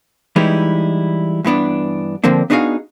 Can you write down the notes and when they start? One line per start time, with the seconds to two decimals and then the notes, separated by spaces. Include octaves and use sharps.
0.36 E3 G3 G#3 D#4 E4
1.45 G2 E3 B3 D4
2.24 D3 F3 A#3 C4 D4
2.50 B3 D4 D#4 F#4 G#4 F5